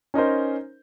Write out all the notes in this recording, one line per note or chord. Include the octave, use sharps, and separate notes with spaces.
C#4 D#4 A#4 C5